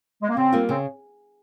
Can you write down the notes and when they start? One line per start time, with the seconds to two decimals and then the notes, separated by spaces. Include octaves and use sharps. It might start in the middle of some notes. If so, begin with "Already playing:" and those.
0.22 G#3
0.29 A#3
0.37 C#3 C4
0.52 G3 A#3 F4
0.69 C#3 C4